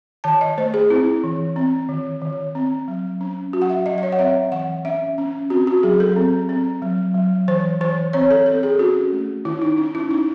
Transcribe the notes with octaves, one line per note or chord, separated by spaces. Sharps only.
D#3 A5
D#5
A3 C5
G#4
C4 E4
E3
C4
D#3
D#3
C4
F#3
C#4
F#3 F#4
F#5
E5
F#3 D#5
D#5
C#5
F#5
C4 E5
E3 F#5
C#4 E5
C#4
C4 F#4
F#4
F#3 G#4
A4
C4
C4
F#3
F#3
E3 C5
E3 C5
C4 C#5
A4
C4 A4
G#4
C#4 F#4
A3
D#3 E4
D#4
C#4 D#4
E4
C#4 D#4